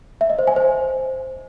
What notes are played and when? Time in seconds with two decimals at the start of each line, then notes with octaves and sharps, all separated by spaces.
0.21 E5
0.30 D#5
0.39 C5
0.47 G#5
0.56 C5